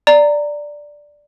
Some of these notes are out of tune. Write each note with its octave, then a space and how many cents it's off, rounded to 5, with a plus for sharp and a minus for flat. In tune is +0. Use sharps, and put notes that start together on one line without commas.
D5 +0 A#5 -15